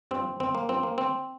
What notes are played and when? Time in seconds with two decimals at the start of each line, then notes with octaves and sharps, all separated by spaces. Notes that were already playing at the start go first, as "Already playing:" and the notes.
0.11 G2 F3 C4
0.40 G1 C4
0.55 A#3
0.69 G2 F3 C4
0.83 A#3
0.98 D2 C4